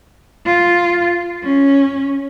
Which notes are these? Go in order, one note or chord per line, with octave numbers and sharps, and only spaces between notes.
F4
C#4